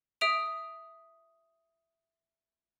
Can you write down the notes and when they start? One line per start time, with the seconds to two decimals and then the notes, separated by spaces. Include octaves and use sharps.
0.21 E5 D#6 D7 F7